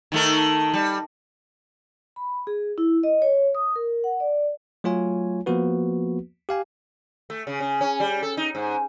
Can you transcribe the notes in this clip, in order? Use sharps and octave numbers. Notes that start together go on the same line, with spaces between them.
D#3 A3 A#4
G3
B5
G#4
E4
D#5
C#5
D#6
A#4
F#5
D5
F#3 A3 F4 C#5 G#5
F3 A#3 B3 F#4 B4
G4 F5 G#5
A3
C#3
C#3
C#4
G3
A4
D#4
G#2